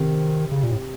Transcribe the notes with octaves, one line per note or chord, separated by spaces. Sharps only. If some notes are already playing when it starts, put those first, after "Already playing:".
Already playing: C3 D#3 C4
C#3
A#2
A2